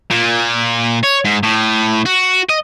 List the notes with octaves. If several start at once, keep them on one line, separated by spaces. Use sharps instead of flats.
A#2
C#5
G#2
A2
F#4
D#5